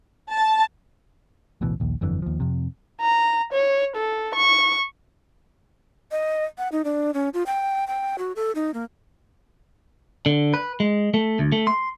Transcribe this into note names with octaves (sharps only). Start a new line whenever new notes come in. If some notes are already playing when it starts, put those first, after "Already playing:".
A5
D1 A1 B2 E3
A#1 D#2
G1 F2 D3 E3
D#2 F3
F2 C3
A#5
C#5
A4
C#6
D#5
F#5
D#4
D4
C#4
F4
G5
G5
F#4
A4
D#4
A#3
D3
B4
G#3
A3
D2
A3
C6